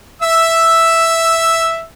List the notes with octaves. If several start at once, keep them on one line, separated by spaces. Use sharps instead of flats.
E5 E6